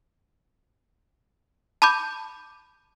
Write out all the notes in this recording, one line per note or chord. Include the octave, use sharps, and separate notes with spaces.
A5 B5 D6 G6